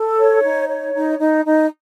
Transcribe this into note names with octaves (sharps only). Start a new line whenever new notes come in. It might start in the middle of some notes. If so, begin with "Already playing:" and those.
Already playing: A4
C#5
D#4
C#5
D#4
D#4
D#4